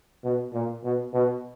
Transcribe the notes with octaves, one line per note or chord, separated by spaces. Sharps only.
B2
A#2
B2
B2